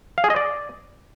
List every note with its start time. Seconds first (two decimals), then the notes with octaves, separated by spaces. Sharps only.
0.18 F5
0.24 G#4
0.30 D#5
0.36 D5